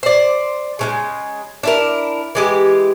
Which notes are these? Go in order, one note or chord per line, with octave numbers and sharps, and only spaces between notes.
C5 D5
C#3 E3 G#3
D4 E4 A#4
E3 G#3 G4